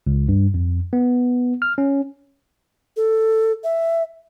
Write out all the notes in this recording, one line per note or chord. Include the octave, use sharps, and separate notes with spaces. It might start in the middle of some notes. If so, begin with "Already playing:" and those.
C#2
G2
F2
B3
F6
C#4
A4
E5